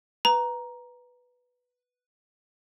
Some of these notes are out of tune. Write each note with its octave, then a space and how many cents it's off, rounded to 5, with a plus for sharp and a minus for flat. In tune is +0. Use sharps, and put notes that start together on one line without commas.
B4 +0 A#5 +10